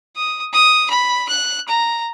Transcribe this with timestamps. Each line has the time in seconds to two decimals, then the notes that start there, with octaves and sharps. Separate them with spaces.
0.16 D#6
0.53 D#6
0.90 B5
1.29 F#6
1.68 A#5